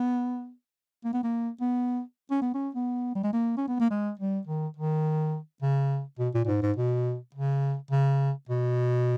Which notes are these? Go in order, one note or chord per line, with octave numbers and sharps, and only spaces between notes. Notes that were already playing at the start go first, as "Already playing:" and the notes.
Already playing: B3
A#3
B3
A#3
B3
C#4
B3
C#4
B3
G3
G#3
A#3
C#4
B3
A#3
G#3
G3
D#3
D#3
C#3
B2
A#2
A#2
G#2
G#2
B2
C#3
C#3
B2